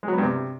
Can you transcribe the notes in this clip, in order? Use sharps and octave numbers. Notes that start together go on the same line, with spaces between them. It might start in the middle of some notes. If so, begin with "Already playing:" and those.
G#3
F#3
B3
G2
C3